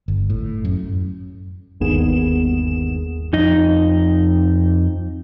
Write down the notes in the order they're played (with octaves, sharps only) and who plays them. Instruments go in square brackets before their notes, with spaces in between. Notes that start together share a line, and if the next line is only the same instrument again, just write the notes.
[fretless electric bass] G1
A2
F#2
[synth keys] G1 D#2 B3 G#4 E7
[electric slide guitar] F2 D#4 D#5